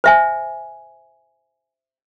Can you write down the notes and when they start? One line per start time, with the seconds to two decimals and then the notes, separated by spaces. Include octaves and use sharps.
0.04 C5 E5 G#5